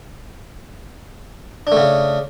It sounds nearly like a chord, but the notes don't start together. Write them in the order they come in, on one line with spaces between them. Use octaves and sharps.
D4 A3 C#3